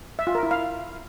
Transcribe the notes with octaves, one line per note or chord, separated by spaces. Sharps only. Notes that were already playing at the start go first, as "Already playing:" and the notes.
E5
F4
A#4
E4
F5